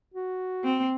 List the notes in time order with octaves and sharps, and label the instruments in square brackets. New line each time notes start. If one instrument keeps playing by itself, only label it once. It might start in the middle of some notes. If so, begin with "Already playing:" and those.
[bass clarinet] F#4
[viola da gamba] C4